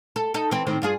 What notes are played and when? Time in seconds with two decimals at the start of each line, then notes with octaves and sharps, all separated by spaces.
0.16 A4
0.34 D#4 A4
0.51 E3 C4
0.67 A2 D#3 C4
0.82 G2 F4 G#4